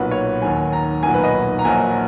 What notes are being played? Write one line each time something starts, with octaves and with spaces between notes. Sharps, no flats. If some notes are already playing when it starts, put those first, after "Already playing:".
Already playing: B1 A#2 F#3 B4
C#5
D#2 D#3 F#3 G#5
A#5
B1 A#2 F#3 G#5
B4
D#5
A#5
A#1 A#2 F#3 G#5